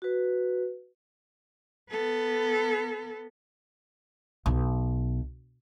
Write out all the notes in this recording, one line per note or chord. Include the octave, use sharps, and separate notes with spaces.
F#4 B4
B3 A4
B1